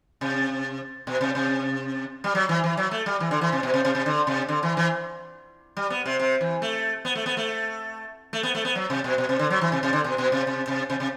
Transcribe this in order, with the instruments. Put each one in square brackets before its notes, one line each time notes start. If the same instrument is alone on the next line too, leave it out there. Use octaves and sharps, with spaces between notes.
[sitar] C3
B2
C3
C3
G3
F#3
E3
E3
F#3
A3
G3
E3
D3
E3
C3
B2
C3
C3
C3
D3
C3
D3
E3
E3
G3
B3
C3
C3
E3
A3
B3
A3
B3
A3
A3
B3
A3
B3
F#3
C3
B2
B2
C3
D3
F#3
E3
C3
C3
D3
B2
B2
C3
C3
C3
C3
C3